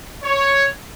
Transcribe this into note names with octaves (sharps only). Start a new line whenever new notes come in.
C#5